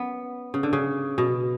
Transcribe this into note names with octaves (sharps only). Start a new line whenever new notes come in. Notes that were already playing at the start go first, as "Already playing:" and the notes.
Already playing: B3 C#4
C#3
D3
C#3
B2